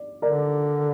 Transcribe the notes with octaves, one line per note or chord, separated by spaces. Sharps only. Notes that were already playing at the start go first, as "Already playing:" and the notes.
Already playing: D5
D3 A#4 D5